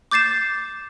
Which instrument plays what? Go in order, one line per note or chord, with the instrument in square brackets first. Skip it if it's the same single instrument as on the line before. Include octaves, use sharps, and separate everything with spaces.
[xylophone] D6 G6 A6 C7 E7